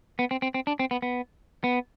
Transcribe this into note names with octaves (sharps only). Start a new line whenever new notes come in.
B3
C4
C4
C4
D4
C4
B3
B3
B3